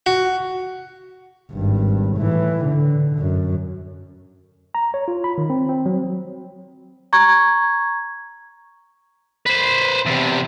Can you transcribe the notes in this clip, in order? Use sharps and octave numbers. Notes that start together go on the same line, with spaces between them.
F#4
G#1 G2
A2 E3
D3
F#2
A#5
C#5
F4
B5
D#3
C4
C4
F#3
A#5 C#6 G#6
B4 C5
E2 C3